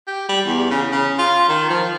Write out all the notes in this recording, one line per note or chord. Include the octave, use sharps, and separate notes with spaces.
G4
G3
E2
C#3
C#3
F4
D#3
F3